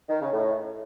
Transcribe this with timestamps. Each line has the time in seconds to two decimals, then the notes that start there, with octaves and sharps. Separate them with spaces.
0.09 D#3
0.20 C#3
0.32 A2